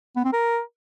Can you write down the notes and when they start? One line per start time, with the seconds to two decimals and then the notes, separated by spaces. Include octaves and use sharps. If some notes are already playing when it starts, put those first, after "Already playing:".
0.16 B3
0.25 C4
0.33 A#4